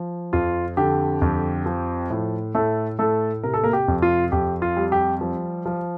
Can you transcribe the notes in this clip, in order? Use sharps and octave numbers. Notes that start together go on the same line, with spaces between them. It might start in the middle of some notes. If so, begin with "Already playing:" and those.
Already playing: F3
F2 F4
D3 G4
F2
F3
A2
A2 A3 A4
A2 A3 A4
C3 A#4
A4
A#3 A#4
G4
F2
F4
F2 G4
F4
G3
G4
F3
F3